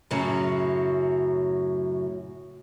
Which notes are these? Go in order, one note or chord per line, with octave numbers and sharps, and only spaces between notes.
F#2 A2 C#3 F#3